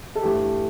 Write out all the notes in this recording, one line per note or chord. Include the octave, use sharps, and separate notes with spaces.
A4
G2 E3 A3 G4